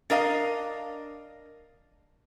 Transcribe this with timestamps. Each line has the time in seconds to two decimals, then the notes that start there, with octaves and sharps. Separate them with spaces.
0.10 D4 A#4 D#5 F5